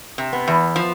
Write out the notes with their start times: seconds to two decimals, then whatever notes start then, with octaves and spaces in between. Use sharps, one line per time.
0.18 C3
0.33 B3
0.48 E2
0.76 F3